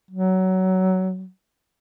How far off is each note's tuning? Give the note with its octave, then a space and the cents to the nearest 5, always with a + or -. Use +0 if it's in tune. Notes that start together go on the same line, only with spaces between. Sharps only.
F#3 +15